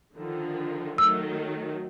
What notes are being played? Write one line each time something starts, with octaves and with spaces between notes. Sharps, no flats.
D3 D#3 F3
D#3 F#3 A3 E6